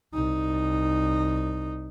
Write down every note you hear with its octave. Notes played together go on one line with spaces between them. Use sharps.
C2 D#4